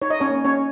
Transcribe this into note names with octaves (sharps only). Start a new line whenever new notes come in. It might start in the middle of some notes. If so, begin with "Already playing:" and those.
D#4 C#5
D#5
C#4 C#5
A#3
C#4 C#5